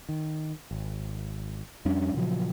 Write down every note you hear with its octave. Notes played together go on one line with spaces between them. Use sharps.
D#3
G#1
F2 G3 C#4 D4
A#2 C#3 F3 F#3